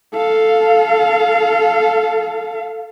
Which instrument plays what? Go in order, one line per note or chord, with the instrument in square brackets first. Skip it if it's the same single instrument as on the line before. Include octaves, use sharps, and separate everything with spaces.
[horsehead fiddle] A4 F5